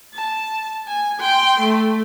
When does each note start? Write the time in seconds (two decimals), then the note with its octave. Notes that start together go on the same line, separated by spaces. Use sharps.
0.13 A5
0.88 G#5
1.20 G5 C6
1.60 A3